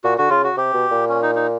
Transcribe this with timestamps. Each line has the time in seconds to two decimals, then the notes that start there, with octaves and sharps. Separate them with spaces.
0.04 A#2 F#4
0.18 D3 F#4
0.30 C#3 F4
0.44 F#4
0.57 C3 G4
0.74 B2
0.91 A#2
1.09 C#4
1.22 D#4
1.35 D#4